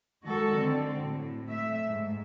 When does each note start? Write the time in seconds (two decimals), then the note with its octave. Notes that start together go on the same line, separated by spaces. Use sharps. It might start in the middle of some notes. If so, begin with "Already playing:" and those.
0.23 D#3 G#3 F#4 A4
0.53 D3 C4
1.03 A2
1.49 A3 E5
1.88 G#2